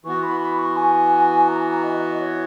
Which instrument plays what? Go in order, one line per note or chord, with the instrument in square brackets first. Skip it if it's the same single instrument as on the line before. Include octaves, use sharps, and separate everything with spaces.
[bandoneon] E3 B3 F#4 [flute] C#6
[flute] B5
B5
C#6
G#5
A#5
A#5
D#5
D#5
C#5